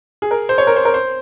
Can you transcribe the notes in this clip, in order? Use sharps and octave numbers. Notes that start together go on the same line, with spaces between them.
G#4
A#4
C5
C#5
A#4
C5
A#4
C5